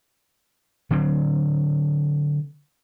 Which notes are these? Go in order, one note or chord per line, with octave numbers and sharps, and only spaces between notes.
D3 F#3 C4